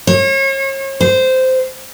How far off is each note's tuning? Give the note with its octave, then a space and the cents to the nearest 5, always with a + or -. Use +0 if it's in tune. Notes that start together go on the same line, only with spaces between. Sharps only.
C#5 -40
C5 -10